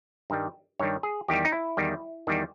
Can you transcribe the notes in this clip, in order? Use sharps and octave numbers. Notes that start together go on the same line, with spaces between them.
G2 D#3 G3
G2 D#3 G3 C#5
G#4
E2 D#3 G3 G4
D#4
E4
E2 D#3 G3
E2 D#3 G3